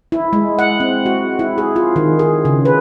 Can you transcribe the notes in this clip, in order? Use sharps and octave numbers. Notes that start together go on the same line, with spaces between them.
E4
G#3
F#5
C4
F#4
E4
G#4
F4
D#3
G#4
C#3
B4